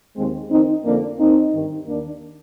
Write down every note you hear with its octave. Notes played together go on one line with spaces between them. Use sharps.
D#2 D#3 G#3 C4
F2 D#3 C4 D#4
F2 D3 A#3 D4
D#2 D#3 C4 D#4
G2 D#3
D#2 D#3 A#3 D4